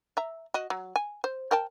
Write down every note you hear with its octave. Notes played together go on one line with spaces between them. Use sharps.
E5 A#5
F#4 D#5
F#3
G#5
C5
A#4 G5 A5